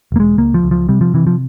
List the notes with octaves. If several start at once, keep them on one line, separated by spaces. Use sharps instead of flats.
E1 A#3
G#3
C#2 A#3
F3
C#2
F3
C3 G3
F3
C3 E3
F3